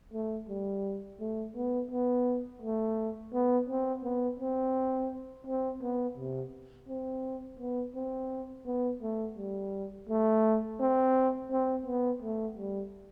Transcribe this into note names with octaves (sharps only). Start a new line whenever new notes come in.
A3
G3
A3
B3
B3
A3
B3
C4
B3
C4
C4
B3
C3
C4
B3
C4
B3
A3
G3
A3
C4
C4
B3
A3
G3